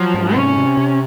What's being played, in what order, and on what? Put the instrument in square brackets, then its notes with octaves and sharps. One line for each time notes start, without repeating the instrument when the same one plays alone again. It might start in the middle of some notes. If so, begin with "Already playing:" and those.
Already playing: [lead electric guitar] F3 [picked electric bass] F#3
[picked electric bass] G#2
[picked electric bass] C3 [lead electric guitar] C#4
[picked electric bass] C3
C3